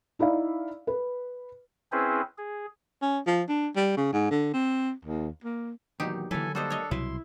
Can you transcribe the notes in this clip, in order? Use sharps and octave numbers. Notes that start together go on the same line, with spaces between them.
D#4 E4 D5 F5
B4
C4 C#4 E4 G#4 B4 C5
G#4
C#4
F3
D4
G3
C#3
G#2
D3
C4
D#2
A#3
E2 A#2 D#3 F#3 D#4 G4
D3 E3 F#3 A#3 A4 B4 G#5
G3 A#3 D4 F#4 A4 C5 D#5
C#5 D#5
C2 B2 F#3 E4 B4 C6